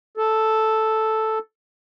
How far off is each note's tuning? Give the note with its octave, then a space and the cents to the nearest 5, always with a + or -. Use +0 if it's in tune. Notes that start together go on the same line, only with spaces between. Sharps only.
A4 -5